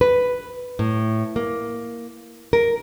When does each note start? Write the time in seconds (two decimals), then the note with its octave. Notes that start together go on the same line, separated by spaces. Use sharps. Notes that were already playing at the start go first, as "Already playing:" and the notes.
0.01 B4
0.79 A2
1.36 A#3
2.53 A#4